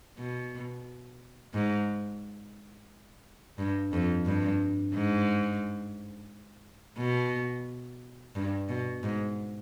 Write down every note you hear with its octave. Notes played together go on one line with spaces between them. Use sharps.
B2
G#2
G2
F2
G2
G#2
B2
G2
B2
G#2